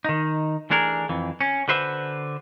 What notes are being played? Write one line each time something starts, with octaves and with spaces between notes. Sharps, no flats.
D#3 D#4
E3 A3 D4 G#4 A#4
F2 E3
C#4
D3 F#4 B4 C5 E5